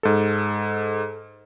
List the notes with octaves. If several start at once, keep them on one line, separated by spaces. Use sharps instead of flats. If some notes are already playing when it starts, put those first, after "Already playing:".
G#2 A4